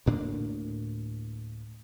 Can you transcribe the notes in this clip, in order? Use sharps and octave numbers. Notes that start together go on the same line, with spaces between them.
D2 A2 A#3 D4